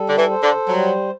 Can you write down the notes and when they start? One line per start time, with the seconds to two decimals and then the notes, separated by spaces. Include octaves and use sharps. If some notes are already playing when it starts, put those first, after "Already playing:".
Already playing: G3 A4
0.09 D3
0.17 E3
0.30 C5
0.43 D3
0.68 F#3 G3